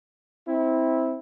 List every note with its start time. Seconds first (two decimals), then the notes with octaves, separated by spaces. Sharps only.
0.48 C4 E4